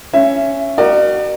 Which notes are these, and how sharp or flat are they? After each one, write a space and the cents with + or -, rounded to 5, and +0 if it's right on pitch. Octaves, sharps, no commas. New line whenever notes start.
C#4 +0 E5 +20
F#4 +35 A#4 +0 D5 +40